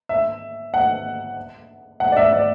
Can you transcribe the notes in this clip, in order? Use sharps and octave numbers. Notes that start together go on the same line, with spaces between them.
E5
F#5
F#5
D5
E5
D5